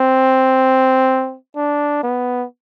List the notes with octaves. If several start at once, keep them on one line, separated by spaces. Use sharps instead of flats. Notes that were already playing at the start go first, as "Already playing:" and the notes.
Already playing: C4
D4
B3